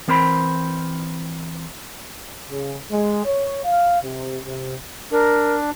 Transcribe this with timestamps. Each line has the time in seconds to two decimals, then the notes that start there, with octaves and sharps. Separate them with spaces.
0.08 E3 C4 A#4 C5 B5
2.50 C#3
2.91 G#3
3.25 C#5
3.64 F5
4.02 C3
4.46 C3
5.12 D4 A#4